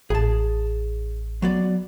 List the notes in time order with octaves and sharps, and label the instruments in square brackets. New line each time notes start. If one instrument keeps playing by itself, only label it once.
[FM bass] A1 [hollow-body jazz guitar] G#4 A5
[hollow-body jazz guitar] F#3 B3 D5